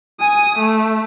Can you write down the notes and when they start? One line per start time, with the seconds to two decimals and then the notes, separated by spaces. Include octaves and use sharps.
0.20 G#5 D#6
0.58 A3